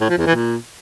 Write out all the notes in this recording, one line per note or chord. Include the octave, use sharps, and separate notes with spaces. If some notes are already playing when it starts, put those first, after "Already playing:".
A2
F3
E2
E3
A#2